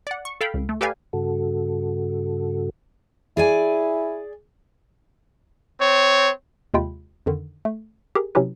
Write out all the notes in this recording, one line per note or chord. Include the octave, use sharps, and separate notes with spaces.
D5 F#5
C#6
A4 F5 G5 B5
C#2
A3
G4 A4 B4 D5 F5 G#5
G2 C#3 F#4 A4
E4 G#4 D5 G#5
C4 C#5
D#2 C3 G#3 F4 G5 B5
F2 D3 D#3
A3
G4 G#4 A#4
C3 F#3 C#4 E4 G4 B4